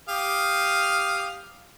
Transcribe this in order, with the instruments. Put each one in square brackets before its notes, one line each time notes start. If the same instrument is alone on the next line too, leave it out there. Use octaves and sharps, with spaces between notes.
[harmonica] G4 F5 D#6